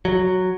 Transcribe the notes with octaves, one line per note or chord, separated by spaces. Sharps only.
F#3